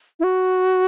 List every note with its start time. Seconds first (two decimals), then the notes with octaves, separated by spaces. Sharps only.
0.20 E4
0.24 F#4